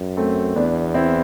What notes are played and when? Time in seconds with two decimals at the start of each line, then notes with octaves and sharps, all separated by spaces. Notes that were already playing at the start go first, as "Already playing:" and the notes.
Already playing: F#2
0.17 A3 C4
0.56 E2 B3 D4
0.94 C4 E4